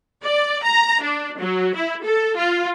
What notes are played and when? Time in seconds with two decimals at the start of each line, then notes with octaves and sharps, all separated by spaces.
0.23 D5
0.63 A#5
1.02 D4
1.39 F#3
1.75 E4
2.04 A4
2.36 F4